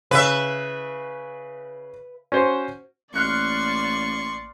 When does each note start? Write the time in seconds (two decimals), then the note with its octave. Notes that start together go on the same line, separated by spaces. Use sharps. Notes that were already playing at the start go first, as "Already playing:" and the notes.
0.11 C#3 B4 E5
2.32 C#4 F#4 C5
3.14 A1 A#3 D5 C6 C#6 F6 F#6 C#7